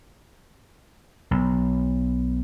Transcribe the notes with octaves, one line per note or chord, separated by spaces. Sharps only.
B1